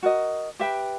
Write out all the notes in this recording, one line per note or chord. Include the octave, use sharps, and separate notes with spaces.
F#4 A#4 D#5
G4 B4 E5 G5